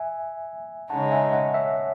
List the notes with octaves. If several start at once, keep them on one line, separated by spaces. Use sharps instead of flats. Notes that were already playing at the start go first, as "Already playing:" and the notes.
Already playing: E5 G#5
C#3 G#3 D#4 F#5 A5
E5 G#5
D#5 F#5
C#5 E5